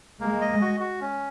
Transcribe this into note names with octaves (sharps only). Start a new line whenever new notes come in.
G#3 A#3
D#5
F#4
F#4
C#4